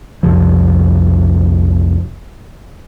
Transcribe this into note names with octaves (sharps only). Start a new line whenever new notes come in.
B1 F2 C3 F3